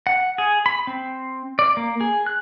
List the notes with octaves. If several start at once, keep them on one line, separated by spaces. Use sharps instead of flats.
F#5
G#4
B5
C4
D5
A#3
G#4
F#6